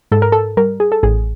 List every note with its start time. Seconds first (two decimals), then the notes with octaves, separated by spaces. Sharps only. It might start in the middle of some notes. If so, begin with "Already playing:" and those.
0.11 G#2 A4
0.22 A#4
0.32 A4
0.57 G3 A#4
0.80 G#4
0.92 A4
1.03 A1 G#4